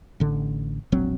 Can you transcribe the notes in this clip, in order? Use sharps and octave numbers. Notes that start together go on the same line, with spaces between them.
A1 D3
E1 A#1 F#3 C4